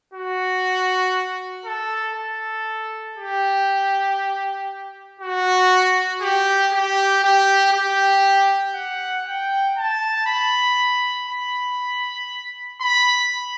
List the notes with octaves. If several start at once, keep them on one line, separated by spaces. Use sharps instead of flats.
F#4
A4
A4
G4
F#4
G4
G4
G4
G4
F#5
G5
A5
B5
B5
B5